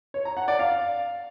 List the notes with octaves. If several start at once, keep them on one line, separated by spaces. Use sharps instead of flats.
C#5
A#5
F#5
D5
F5